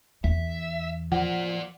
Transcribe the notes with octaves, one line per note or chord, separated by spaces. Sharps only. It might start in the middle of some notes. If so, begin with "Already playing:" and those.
E2 E5
F3 F4 D5 F#5